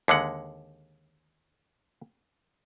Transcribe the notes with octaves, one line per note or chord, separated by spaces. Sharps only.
D#2 D3 G#3 F#5